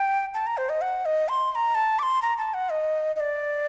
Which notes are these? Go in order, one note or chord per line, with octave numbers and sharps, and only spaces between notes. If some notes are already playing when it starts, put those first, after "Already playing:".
Already playing: G5
A5
A#5
C5
D#5
F#5
D#5
C6
C6
A#5
A5
D6
C6
A#5
A5
F#5
D#5
D#5
D5